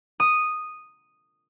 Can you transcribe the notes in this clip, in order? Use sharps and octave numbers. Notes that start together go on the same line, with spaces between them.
D#6